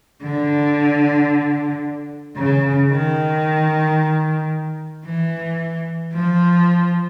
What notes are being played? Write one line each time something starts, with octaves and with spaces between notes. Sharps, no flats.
D3
C#3
D#3
E3
F3